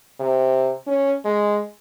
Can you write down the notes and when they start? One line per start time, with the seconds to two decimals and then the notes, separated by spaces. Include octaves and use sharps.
0.20 C3
0.87 C#4
1.25 G#3